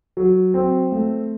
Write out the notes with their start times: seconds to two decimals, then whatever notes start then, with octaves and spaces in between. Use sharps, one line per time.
0.17 F#3
0.54 C4
0.92 A3